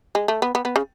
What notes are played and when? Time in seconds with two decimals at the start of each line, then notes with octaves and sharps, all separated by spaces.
0.15 G#3
0.28 A3
0.42 B3
0.55 B3
0.65 B3
0.76 C#3